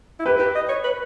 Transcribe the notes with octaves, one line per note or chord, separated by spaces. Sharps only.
E4
G4 B4
G4
D#5
C#5
B4